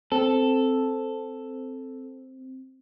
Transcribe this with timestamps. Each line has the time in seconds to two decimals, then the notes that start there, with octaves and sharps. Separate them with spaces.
0.12 C4 A4